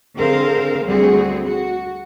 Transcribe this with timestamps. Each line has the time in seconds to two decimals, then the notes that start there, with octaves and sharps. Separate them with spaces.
0.16 D3 C4 G#4 A#4 C5 F5
0.85 D2 G3 C4 F#4 G#4
1.43 F#4